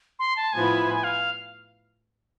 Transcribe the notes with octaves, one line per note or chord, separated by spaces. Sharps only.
C6
A5
A2 F3 B3 E4 G#5
G#5
F5